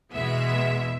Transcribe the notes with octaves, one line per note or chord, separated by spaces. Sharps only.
E2 B2 G#3 B3 E5